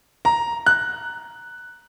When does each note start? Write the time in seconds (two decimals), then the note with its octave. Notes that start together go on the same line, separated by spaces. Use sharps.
0.25 A#5
0.66 F#6